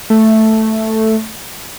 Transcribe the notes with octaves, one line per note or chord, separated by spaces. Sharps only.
A3